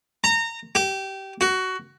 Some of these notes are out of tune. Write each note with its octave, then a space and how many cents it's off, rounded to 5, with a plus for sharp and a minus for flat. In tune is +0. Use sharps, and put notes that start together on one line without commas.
A#5 -25
G4 -20
F#4 +15